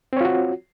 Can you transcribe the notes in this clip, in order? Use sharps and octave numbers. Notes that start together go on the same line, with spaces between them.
C4 F4 F#4 C#5